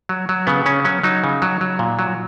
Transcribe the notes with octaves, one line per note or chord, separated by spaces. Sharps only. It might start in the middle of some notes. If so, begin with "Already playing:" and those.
F#3
F#3
C#3 B3
C#3 C#4
F#3 C#4
F#3 D#4
C#3
F#3
F#3
A#2
F#3